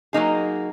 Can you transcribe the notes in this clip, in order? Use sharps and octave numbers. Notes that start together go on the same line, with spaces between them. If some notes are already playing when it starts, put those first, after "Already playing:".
F#3 A#3 D#4 G#4